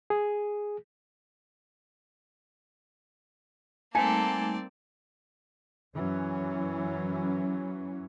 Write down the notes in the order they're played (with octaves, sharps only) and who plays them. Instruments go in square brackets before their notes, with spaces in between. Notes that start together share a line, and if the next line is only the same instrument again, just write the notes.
[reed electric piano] G#4
[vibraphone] G3 A3 D#4 [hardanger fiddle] A#3 A4 [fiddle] C4 D5 [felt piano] G#5
[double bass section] F#2 E3 F#3 C#4